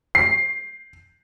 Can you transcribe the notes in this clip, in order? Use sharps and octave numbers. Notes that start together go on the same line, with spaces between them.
C7